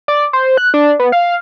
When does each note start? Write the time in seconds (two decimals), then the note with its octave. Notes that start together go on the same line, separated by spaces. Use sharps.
0.08 D5
0.33 C5
0.57 F#6
0.74 D4
0.99 B3
1.12 F5